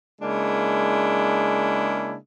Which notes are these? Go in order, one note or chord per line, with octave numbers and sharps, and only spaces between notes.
C#3 G#3 A#3 D4 E4